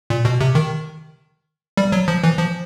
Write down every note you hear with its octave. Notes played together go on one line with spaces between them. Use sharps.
A#2
B2
C3
D#3
G3
F#3
F3
E3
F3